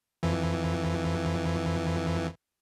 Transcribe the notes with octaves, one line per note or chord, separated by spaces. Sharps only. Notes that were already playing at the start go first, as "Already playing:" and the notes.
F2 E3